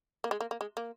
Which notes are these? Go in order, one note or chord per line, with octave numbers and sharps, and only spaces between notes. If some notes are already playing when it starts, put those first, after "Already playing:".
A#3
G#3
A#3
A#3
G#3
A#3